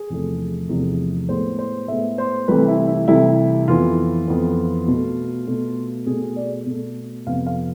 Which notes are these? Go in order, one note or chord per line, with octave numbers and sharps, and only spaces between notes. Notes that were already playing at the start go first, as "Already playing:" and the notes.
Already playing: G#4
E2 C3 F3 A3
E2 C3 F3 A3
A2 G#3 B3 C5
C5
A2 G#3 B3 E5
C5
C2 C3 E3 A3 B4
E4
E4
C2 C3 E3 A3 E4
F2 E3 B3 F4
F2 E3 B3
B2 A3
B2 A3
B2 A3 G#4
G#4
D5
B2 A3
F2 C3 F3 B3 F5
F5